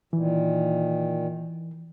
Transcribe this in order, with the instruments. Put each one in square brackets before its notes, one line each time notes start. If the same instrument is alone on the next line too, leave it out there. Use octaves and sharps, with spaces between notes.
[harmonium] A#2 D#3 [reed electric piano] E3